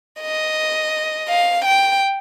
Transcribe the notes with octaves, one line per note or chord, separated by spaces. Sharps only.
D#5
F5
G5